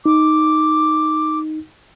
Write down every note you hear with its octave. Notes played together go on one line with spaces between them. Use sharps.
D#4 D6